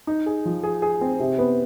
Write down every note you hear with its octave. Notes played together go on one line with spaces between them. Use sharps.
D#4
G#4
F3
G#4
G#4
C4
C3
B3